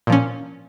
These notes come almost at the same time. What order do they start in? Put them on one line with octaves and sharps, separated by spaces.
A#2 F3 C#4